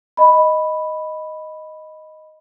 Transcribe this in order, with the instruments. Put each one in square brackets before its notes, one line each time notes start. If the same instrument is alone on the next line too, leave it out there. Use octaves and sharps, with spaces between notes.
[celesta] D#5 B5